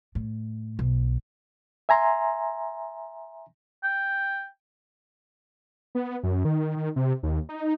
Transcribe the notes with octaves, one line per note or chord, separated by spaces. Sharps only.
A2
B1
E5 G#5 A#5 C6
G5
B3
F#2
D#3
D#3
C3
D#2
D#4